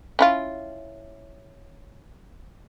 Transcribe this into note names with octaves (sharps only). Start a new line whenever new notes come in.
C#4 E4 F4